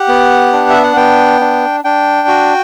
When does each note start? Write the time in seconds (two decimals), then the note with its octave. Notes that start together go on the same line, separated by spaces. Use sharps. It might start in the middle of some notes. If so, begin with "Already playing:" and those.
Already playing: G4 F#5
0.08 B3
0.53 D4
0.70 E5
0.83 F#5
0.96 B3 G5
1.41 D4
1.84 D4 G5
2.28 F#4